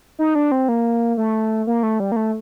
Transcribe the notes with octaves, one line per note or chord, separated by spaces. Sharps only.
D#4
D4
C4
A#3
A3
A#3
A3
G3
A#3
A3